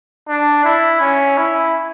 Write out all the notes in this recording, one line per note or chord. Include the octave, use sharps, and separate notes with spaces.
D4
E4
C#4
E4